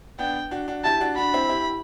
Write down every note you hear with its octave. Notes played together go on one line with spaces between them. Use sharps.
B3 D4 G5
D4 F#4
D4 F#4
E4 G4 A5
D4 F#4
D4 F#4 B5
C4 E4
E4 G4